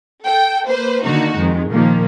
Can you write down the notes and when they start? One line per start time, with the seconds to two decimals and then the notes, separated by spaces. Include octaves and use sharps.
0.25 A4 G5
0.69 A#3 B4 C5
1.04 D3 D#3 A#3 D#4 F#4
1.38 F2 D#3 G#3
1.71 A#2 D#3 F3 A#3